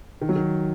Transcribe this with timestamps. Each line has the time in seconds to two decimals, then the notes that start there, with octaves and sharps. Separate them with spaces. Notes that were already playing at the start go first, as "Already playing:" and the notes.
0.21 D#3
0.29 F#3
0.36 D#3